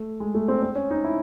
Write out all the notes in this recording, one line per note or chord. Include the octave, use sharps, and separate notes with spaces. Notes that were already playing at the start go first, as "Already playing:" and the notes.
Already playing: A3
G#3
A3
C4
C4
C#4
D#4
E4